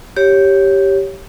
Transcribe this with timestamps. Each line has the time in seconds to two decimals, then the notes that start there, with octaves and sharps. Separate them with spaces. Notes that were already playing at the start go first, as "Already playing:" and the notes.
0.16 G4 C#5